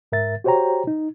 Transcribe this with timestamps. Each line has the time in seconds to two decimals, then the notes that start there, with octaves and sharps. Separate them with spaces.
0.12 G#2 A#4 E5 A6
0.44 F#4 G4 C5 C#5 G5 A#5
0.87 D#4